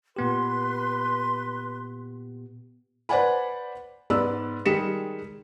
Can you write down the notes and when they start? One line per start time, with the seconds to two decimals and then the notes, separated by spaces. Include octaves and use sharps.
0.16 A#2 B3 G4 B4 C6
3.09 B4 C5 D5 F#5 G#5 B5
4.10 G#2 B3 D5 B5 E6
4.66 D#3 G3 G#3 B6 C#7 E7